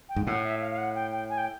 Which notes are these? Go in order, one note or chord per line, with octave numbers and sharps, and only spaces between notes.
G5
G#2
A2 F#5
E5
F5
F5
F#5
G5
G5
G#5
G5